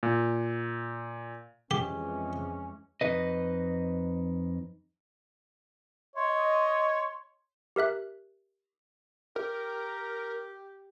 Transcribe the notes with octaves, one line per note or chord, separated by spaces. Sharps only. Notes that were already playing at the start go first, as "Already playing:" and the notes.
A#2
F2 E3 G#3 C#4 G4
F2 D#4 B4 D#5
C#5 D#5 C6
G4 A#4 E5 F#6
G4 A#4